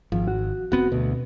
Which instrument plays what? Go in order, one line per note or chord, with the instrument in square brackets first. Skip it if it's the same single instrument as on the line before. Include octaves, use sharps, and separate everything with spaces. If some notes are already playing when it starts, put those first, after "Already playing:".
[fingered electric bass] G#1 [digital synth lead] F3
[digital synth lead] F#4
[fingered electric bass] F1 B3 C4 [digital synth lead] F#4
[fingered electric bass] D2 [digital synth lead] B2